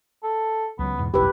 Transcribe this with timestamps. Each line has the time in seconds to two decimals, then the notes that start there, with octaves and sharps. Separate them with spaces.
0.23 A4
0.79 C#2 F#3 B3
0.98 E2 G#2 B2
1.14 F#1 B1 F2 E4 G4 B4